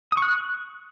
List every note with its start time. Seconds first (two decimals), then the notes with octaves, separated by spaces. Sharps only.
0.12 D#6
0.17 C#6
0.22 F#6